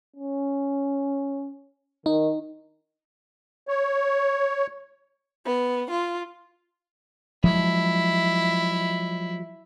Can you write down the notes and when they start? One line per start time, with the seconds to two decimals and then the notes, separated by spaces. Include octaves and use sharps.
0.16 C#4
2.06 D#3 D#4
3.68 C#5
5.44 B3
5.90 F4
7.44 F3 F#3 G#3 E4